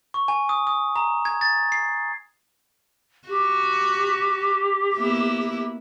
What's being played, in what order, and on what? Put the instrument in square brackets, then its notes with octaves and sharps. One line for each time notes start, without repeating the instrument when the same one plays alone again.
[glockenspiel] C#6
G#5
D#6
D#6
A#5
G#6
A6
C7
[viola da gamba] F#4 [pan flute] G4
[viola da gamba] A#3 B3 E4